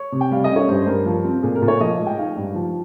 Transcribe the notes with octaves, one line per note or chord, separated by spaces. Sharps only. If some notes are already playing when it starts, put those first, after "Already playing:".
Already playing: C#5
C3
G5
G3 F5
D#5
C#4
C#5
G2 C5
C5
G2 A#4
F3
C4
A#2 G#4
A#4
A#2
C#5
F3 D#5
G#3
G5
D#4 F5
G2
F3